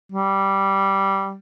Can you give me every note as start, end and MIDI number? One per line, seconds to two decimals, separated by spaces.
0.12 1.36 55